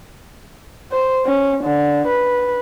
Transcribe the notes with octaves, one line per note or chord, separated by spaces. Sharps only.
C5
C#4
D3
B4